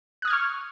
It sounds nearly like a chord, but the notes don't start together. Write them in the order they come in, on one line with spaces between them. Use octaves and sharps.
F#6 D#6 G#6 F6 C#6